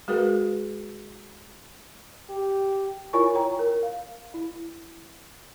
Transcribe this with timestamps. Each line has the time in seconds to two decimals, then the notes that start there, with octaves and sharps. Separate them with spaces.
0.08 G#3 F#4 G#4 A#4 B4
2.29 G4
3.13 E4 F4 A#4 C#5 G#5 C#6
3.35 C#5 G5 A#5
3.59 A#4
3.83 F5
4.34 E4